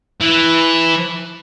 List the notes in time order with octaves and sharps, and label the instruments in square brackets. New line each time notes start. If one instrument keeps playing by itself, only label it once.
[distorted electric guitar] E3